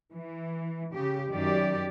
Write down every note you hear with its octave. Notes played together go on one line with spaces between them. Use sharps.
E3
C#3 G4
F#2 D#3 G4 D5